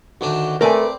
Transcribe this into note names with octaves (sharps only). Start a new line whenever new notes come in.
D2 D#3 D4 F#4
A3 C4 A#4 B4 D5 G#5